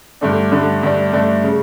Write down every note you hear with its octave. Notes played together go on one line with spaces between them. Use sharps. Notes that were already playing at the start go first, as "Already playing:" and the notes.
G2 D3 A3 D4
G2 D3 A3 D4
G2 D3 A3 D4
G2 D3 A3 D4
C#3